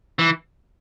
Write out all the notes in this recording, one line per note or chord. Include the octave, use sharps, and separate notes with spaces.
E3